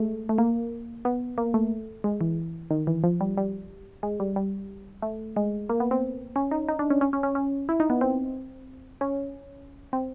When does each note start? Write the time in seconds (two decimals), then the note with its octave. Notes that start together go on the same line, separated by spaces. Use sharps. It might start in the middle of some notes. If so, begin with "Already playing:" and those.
Already playing: G#3 A3
0.29 A3
0.38 A#3
1.05 B3
1.38 A#3
1.54 A3
2.04 G#3
2.21 E3
2.71 D#3
2.87 E3
3.04 F3
3.21 G3
3.37 G3
4.03 G#3
4.20 G3
4.36 G3
5.02 A3
5.36 G#3
5.69 A#3
5.80 B3
5.91 C4
6.36 C#4
6.51 D#4
6.69 D#4
6.79 D4
6.90 C#4
7.01 C#4
7.13 C#4
7.23 C#4
7.35 C#4
7.69 E4
7.80 D#4
7.90 B3
8.01 C4
9.01 C#4
9.93 C4